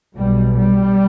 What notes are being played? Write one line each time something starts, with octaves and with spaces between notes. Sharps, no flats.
B1 B2 G3
G3